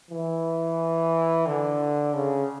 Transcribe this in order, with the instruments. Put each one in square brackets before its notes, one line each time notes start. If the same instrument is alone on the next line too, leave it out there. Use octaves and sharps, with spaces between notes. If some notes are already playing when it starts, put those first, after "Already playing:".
[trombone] E3
D3
C#3